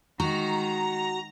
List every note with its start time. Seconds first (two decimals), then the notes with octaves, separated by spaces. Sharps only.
0.20 D#3 G#3 F#4 A#5